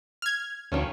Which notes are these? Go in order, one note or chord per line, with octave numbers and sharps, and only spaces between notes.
F6 G#6
D2 D#3 F3 C#4